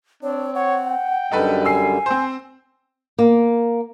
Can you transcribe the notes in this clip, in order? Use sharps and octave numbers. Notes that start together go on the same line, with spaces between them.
C4 D4 C#5
C#5 F#5
G5
F#2 D3 G3 D#4 A4 B4
G#5 E6 C7
C4 C5
A#3